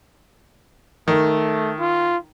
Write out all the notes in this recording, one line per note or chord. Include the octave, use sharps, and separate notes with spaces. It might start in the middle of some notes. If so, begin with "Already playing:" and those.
D#3 A3
F4